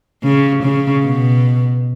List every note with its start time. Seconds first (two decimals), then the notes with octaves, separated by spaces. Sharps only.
0.23 C#3
0.63 C#3
1.03 B2